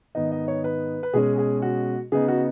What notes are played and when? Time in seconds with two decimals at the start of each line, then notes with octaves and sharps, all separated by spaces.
0.15 G#2 D#3 B3 D#4 D#5
0.32 D#5
0.48 C#5
0.64 B4
1.03 B4
1.14 B2 G#3 C#4 G#4
1.38 G#4
1.62 F#4
2.12 C#3 B3 D#4 G#4
2.28 F#4